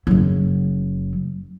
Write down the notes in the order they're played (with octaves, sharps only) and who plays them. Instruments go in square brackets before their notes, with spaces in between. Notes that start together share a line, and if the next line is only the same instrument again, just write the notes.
[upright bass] F#1 F#3